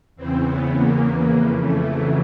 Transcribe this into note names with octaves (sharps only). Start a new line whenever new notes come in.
E2 C#3 E3 C4
B3
A#3
F2 C#3 E3
A3
F#3